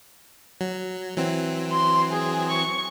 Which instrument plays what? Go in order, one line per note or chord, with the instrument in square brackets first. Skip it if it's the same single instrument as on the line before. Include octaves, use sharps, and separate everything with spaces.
[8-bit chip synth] F#3
E3 F#3 C4
[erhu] C6
G#4
C#6